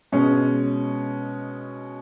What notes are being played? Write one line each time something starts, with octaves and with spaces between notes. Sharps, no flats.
B2 G#3 C#4